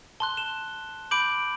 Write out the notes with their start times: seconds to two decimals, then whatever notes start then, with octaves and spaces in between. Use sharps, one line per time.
0.20 A5 C6 F#6 G7
0.37 E7 G7
1.11 B5 D6 G6 D7 F#7